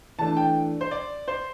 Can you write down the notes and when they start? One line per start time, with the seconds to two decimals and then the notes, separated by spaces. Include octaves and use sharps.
0.19 E3 A3 D4 A5
0.37 G5
0.81 C5
0.91 D5
1.28 C5